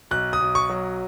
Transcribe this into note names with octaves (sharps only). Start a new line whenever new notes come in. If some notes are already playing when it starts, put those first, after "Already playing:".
B1 F#6
D#6
B1
C#6
F#3